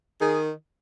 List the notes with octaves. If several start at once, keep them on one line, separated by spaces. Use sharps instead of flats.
D#3 G#4